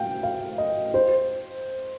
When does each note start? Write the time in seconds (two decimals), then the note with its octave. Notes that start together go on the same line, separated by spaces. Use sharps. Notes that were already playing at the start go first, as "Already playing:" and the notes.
Already playing: F5 G5
0.23 F5
0.58 D#5
0.94 C5